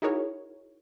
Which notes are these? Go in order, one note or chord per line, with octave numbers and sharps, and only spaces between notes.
D#4 E4 F#4 G#4 A#4 C#5